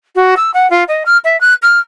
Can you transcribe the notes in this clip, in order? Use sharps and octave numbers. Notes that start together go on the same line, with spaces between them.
F#4
E6
F#5
F4
D#5
F6
E5
F#6
F6